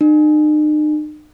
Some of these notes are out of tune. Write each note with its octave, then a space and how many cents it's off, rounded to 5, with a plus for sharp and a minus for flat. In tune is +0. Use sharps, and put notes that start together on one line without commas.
D#4 -45